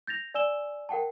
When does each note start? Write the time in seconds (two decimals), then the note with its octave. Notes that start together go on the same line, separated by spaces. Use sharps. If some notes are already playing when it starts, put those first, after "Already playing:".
0.07 G6 A6 A#6 F7
0.34 D5 G#5 E6 E7 G7
0.89 A#4 F#5 G5 A5